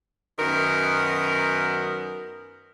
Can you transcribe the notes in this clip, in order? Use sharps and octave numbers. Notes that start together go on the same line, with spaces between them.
F#2 D#3 B3 A#4